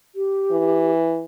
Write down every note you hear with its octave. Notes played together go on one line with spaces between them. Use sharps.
G4
E3